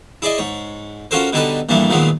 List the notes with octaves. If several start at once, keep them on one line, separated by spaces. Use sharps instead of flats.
E4 G#4 D5 D#5
G#2 C#5
C#4 F4 F#4 A4 A#4 C5
B2 D3 G3 D#4 A4 B4
A#1 G2 E3 G3 A3 A#3
A#2 D#3 F3 F#3 G#3 B3